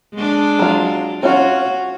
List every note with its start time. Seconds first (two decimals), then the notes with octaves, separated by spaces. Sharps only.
0.14 G#3 D4
0.59 F#3 F4
1.23 C#4 F4 F#4